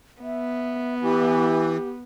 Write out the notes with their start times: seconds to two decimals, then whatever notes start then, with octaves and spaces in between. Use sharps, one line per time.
0.22 B3 E5
1.02 E3 G4